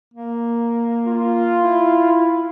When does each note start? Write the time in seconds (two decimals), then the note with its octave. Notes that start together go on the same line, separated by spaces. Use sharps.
0.14 A#3
1.06 F4
1.62 E4